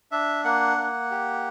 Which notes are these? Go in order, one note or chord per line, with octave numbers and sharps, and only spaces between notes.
D4 E5
A#3 F#5
A#3
G4